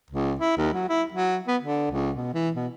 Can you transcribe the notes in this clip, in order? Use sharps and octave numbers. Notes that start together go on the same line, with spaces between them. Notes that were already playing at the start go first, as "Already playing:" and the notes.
C#2
E4
D#2
F#3
E4
F#3
B3
D3
C#2
B2
E3
B2